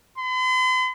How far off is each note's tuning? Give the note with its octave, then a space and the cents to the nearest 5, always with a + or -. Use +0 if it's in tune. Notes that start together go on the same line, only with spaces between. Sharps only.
C6 -45